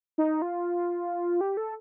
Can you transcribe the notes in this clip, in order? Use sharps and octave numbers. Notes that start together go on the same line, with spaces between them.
D#4
F4
G4
A4